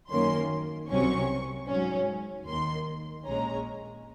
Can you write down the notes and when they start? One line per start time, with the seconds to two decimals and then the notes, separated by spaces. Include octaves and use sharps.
0.10 F#2 D#3 A#3 C#4 C6
0.89 C2 C3 F#3 C#4 C#6
1.69 G#2 F#3 C#4
2.47 D#2 D#3 A#3 C6
3.27 A#1 A#2 G#3 C#4 A#5